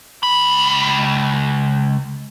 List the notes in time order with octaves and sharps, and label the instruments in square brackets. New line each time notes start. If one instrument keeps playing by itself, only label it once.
[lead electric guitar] C#2 B5